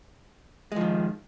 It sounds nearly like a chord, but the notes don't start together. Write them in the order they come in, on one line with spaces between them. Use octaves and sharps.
G#3 F3 D#3